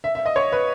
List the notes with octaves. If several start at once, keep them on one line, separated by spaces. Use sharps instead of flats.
E5
E5
D#5
C#5
B4